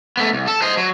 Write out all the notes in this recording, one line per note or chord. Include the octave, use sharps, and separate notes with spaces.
A3 B3
C2
A4
C5 D#5
F#3